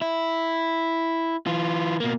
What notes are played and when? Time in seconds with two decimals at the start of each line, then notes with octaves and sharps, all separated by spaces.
0.01 E4
1.46 E3 F4
2.00 B2 A#3